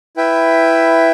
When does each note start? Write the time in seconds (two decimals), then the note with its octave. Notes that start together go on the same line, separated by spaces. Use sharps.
0.16 E4 B4 E5 G5